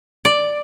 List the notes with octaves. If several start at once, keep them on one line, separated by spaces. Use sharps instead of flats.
D5